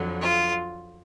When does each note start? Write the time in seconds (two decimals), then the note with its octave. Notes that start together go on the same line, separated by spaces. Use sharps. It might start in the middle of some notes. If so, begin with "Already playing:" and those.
Already playing: F2 D3 F#3
0.20 F4